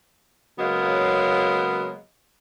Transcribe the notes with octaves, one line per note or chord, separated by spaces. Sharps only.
C#3 F#3 G#3 A#3 B3